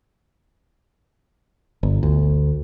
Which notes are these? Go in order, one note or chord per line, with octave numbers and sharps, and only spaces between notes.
G1
D2